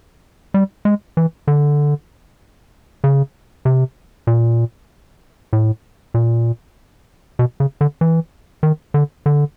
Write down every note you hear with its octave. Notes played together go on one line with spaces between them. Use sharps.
G3
G#3
E3
D3
C#3
C3
A#2
A2
A#2
B2
C#3
D3
E3
D#3
D3
D3